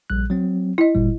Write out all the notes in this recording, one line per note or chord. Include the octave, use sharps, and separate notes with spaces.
A#1 G3 F#6
F#3 C4
E4 D#5
G1 A#2 G3